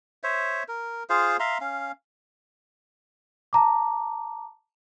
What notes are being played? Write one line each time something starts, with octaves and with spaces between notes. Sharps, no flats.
C5 C#5 E5
A#4
F4 G#4 C5 F5
E5 F5 A#5 C6
C#4 F5
A5 A#5 D6